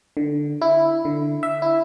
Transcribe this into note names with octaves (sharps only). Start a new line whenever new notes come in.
D3
E4
D3
E5
E4